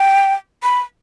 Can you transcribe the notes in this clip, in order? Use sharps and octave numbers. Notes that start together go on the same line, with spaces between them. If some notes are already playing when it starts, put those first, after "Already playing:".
Already playing: G5
B5